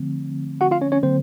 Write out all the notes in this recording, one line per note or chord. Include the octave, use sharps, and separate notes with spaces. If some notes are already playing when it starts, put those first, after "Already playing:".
Already playing: D3 F3 A3 C4
F#4 F#5
F4 F5
C#4 C#5
C#4 C#5
D3 F#3 A#3 C4 C5